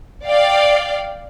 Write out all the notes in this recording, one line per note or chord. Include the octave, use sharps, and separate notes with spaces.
D5 F5 G5